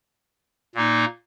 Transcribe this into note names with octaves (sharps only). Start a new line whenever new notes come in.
A#2 A#3 D#4